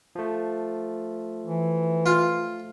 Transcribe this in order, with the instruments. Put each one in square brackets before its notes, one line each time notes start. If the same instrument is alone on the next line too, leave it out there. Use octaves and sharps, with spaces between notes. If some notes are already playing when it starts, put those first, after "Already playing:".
[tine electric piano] F3 A3
[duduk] E3
[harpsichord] F4